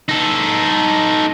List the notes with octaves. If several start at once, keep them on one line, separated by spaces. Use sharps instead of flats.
D#4 A4